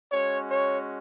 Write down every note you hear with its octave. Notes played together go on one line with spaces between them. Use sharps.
G#3 C#4 F#4 C#5
C#5